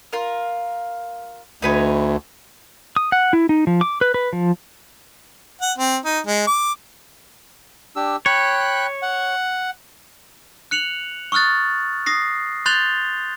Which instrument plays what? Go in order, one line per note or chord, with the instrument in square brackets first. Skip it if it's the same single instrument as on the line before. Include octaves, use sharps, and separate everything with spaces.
[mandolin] F4 A#4
[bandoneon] D2 [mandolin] D#4 B4 C#5
[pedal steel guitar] D#6
F#5
E4
D#4
F3
D6
B4
B4
F3
[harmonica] F#5
C4
D#4
G#3
D6
[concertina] D4 G4 E6
[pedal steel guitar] C#5 [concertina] G5 B5 F#6
[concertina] F#5
[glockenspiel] F#6 C#7 F7 F#7
C#6 D#6 F6 F#6 A6
D#6 A#6 C7
C6 F#6 G6 A6 F7 G7